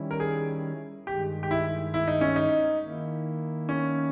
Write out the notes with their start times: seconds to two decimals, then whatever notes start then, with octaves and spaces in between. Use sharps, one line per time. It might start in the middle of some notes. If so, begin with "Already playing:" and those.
Already playing: D#3 G3 C#4 E4
0.11 A#4
0.20 G#4
1.07 G2 D#3 G#3 G4
1.43 G4
1.51 E4
1.94 E4
2.08 D#4
2.21 C#4
2.36 D#4
2.81 D#3 A#3 E4
3.69 C#4